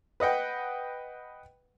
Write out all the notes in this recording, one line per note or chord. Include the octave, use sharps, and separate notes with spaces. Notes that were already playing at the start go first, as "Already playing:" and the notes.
B4 D#5 F#5 G5